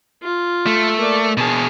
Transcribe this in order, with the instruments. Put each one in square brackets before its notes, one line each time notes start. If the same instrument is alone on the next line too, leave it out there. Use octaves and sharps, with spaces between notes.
[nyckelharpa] F4
[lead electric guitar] A3
[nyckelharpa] A#3 D5
[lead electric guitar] B2 G#4 [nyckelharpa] A5